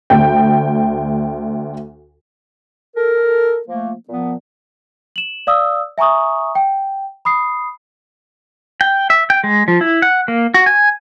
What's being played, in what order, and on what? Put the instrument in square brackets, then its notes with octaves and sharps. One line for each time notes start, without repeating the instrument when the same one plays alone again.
[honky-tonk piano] D2 G5
[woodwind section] A4 A#4
F3 A3 A#3
A#2 F3 B3
[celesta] E7 F#7
D5 F5 D#6 E6
E5 G#5 A#5 C#6 D#6
G5
B5 D#6 C7
[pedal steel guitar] G5
E5
G5
G#3
F3
E4
F#5
A#3
F#4
G#5